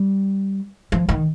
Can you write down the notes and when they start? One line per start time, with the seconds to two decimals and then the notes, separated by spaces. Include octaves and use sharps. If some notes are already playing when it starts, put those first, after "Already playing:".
Already playing: G3
0.92 F3
1.09 D#3